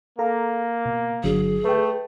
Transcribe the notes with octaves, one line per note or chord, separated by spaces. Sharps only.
A#3 A4 F5 A#5
B2
G1 D3 F#3 G#4
A3 B4 G5